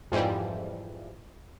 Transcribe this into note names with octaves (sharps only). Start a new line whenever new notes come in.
F2 G#2 E3 F3 G3